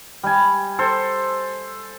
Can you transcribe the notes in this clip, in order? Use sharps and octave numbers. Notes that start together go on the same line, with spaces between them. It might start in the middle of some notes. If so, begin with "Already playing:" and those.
G3 G#5
A4 C5